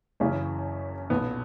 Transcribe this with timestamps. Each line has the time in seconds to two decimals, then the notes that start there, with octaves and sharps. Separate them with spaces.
0.20 F#1 F#2 C#3 E3 C#4
1.10 B1 A#2 B3